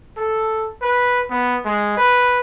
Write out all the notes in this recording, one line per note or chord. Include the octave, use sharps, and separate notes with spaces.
A4
B4
B3
G#3
B4